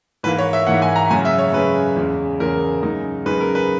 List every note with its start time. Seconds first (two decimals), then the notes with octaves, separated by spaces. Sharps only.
0.23 G#2 E3 A#3 B4
0.39 C#5
0.53 E5
0.67 G#2 E3 A#3 F#5
0.82 G#5
0.96 A#5
1.11 F#2 C#3 G#3 G#5
1.25 E5
1.38 C#5
1.53 F#2 C#3 G#3 B4
1.96 E2 C#3 G#3
2.40 E2 C#3 G#3 A#4
2.83 F#2 C#3 G#3 D#4
3.26 F#2 C#3 G#3 D#4 B4
3.40 A#4
3.55 B4